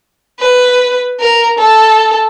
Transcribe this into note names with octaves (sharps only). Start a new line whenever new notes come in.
B4
A#4
A4